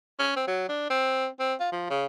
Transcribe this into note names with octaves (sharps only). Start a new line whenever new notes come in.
C#4
C4
F#3
D4
C4
C4
F4
F3
C#3